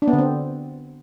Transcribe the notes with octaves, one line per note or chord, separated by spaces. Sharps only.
D4
B3
D3
C4